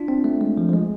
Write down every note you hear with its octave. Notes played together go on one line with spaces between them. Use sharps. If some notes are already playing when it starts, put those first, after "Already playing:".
Already playing: D4 F4
C4
A3
G#3
F3
F3
G#3